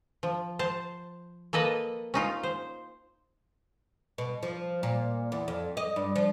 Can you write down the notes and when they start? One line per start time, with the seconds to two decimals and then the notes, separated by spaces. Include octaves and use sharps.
0.23 F3
0.59 C5 A5
1.53 A#3 A4 B4 D#5
2.14 C#4 D#4 F4
2.43 C5
4.18 B2
4.43 F3
4.83 A#2
5.32 E2
5.48 F2
5.77 D#5
5.96 G2
6.16 F3